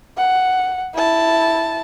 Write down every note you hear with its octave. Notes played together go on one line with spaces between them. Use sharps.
F#5
E4 A5